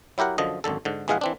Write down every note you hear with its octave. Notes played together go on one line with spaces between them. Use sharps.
F#3 E4 G4 A#4 F#5
F#2 D3 F3 D#5
G#1 F#2 D3 A4
G#2 D3
A#1 E3 G#3 G#4 F5 F#5
E3 C4 D4